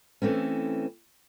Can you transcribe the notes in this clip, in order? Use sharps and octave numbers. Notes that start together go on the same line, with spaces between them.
E3 A3 C4 C#4